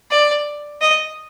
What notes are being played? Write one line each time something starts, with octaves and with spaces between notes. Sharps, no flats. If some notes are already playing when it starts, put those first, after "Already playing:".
D5
D#5